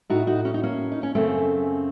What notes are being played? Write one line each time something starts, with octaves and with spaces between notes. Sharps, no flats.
A2 D#4 F#4
D#4 F#4
C#4
D#4
A#3 C#4
D#4
C#4
F#2 C#3 A3 C4